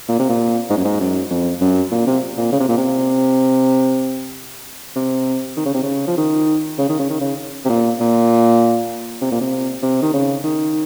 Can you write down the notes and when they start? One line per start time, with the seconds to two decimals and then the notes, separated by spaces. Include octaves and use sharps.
0.09 A#2
0.19 C3
0.29 A#2
0.70 G#2
0.77 F#2
0.85 G#2
1.00 F#2
1.31 F2
1.61 F#2
1.91 A#2
2.07 C3
2.37 A#2
2.52 C#3
2.60 C3
2.69 A#2
2.77 C3
4.96 C3
5.57 D#3
5.65 C#3
5.74 C3
5.83 C#3
6.07 F3
6.18 D#3
6.78 C#3
6.89 D#3
6.99 C#3
7.10 D#3
7.21 C#3
7.65 C3
7.70 A#2
8.00 A#2
9.22 C3
9.32 A#2
9.41 C3
9.82 C3
10.02 D#3
10.13 C#3
10.44 D#3